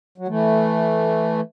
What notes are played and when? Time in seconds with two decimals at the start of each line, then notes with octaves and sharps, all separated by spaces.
0.18 F#3
0.28 E3 A3